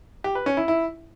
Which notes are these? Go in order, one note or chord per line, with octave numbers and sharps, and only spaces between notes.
G4
B4
C#4
E4
E4